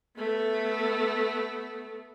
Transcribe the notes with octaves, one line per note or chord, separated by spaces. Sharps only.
A3 B3